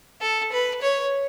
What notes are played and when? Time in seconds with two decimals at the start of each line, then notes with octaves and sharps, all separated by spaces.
0.21 A4
0.52 B4
0.82 C#5